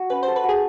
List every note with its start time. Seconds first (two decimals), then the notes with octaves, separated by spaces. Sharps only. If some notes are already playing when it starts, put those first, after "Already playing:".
Already playing: F#4
0.10 C#4 B4
0.23 C5
0.28 A4
0.36 B4
0.44 F#4 G#4